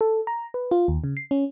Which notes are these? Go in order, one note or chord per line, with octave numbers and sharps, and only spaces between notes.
A4
A#5
B4
F4
D#2
C#3
C7
C#4